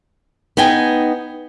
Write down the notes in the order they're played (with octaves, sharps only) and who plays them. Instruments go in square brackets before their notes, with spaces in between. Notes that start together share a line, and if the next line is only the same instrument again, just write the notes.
[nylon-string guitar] B3 D#4 G5 G#5